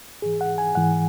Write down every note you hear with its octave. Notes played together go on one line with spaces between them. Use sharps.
G#2 E3 G#4
F#5
G#5
G#2 E3 F#5